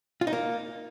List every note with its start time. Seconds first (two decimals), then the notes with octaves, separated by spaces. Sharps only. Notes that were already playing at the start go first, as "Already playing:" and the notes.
0.21 F4
0.27 D#4
0.33 A#3